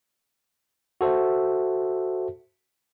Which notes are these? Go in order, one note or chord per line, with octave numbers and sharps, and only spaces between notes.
F#4 A4 C5 E5